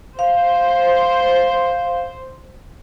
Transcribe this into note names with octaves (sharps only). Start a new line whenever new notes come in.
C5 F5